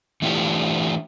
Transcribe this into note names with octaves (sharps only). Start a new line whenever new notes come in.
E3 A3 D4 E4 F4 G4